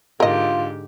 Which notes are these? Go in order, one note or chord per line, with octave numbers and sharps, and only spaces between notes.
G#2 D3 F4 G4 A#4 D#5